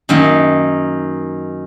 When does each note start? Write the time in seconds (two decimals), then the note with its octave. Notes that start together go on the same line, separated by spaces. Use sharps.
0.09 F#2 D#3 A#3